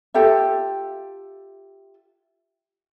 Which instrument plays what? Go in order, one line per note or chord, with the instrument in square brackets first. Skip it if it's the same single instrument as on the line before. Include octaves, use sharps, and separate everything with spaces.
[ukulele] F4 G4 A4 E5